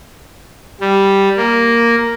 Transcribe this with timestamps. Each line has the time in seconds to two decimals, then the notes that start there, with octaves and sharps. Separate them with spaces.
0.81 G3
1.37 A#3